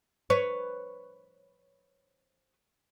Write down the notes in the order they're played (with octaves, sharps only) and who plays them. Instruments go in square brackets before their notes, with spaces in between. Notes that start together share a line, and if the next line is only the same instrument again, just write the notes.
[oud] B4 C#5